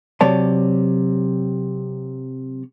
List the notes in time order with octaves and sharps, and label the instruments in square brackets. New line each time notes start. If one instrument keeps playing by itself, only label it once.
[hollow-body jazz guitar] C3 F#3 C#5 D5 A5